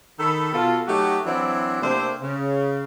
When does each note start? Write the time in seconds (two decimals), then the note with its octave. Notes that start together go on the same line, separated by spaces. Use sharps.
0.19 D#3 A4 B5
0.53 B2 F4 A4
0.87 F#3 A3 D#4 F#4 G4
1.25 E3 F#3 C4 D4 E4
1.82 C3 A3 A#3 C4 D4 C5
2.21 C#3